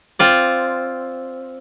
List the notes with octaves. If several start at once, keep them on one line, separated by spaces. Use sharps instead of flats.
C4 F4 D5